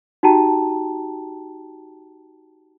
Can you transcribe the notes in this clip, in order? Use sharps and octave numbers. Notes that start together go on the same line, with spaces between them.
D#4 F#4 G4 G5 A5 A#5